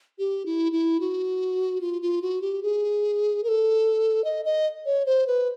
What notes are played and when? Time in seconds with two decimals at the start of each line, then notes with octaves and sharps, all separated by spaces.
0.19 G4
0.46 E4
0.72 E4
1.00 F#4
1.81 F4
2.02 F4
2.22 F#4
2.42 G4
2.63 G#4
3.44 A#4
3.49 A4
4.24 D#5
4.45 D#5
4.86 C#5
5.06 C5
5.27 B4